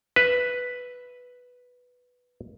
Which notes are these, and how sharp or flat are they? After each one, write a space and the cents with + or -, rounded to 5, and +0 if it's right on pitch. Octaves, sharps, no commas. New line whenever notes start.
B4 +0 E5 +0